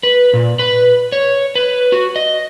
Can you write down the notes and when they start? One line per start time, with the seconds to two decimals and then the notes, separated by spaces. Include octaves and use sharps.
0.03 B4
0.33 A#2
0.59 B4
1.12 C#5
1.55 B4
1.92 F#4
2.16 D#5